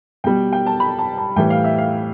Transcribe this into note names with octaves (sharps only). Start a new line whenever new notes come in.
B2 G3 G5
G5
A5
B5
A5
A5
A2 E3 G3 G5
F5
E5
F5